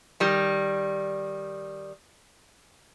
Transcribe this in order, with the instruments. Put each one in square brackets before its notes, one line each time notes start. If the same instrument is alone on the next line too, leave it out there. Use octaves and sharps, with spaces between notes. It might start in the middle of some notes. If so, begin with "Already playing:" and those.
[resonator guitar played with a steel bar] D#3 G3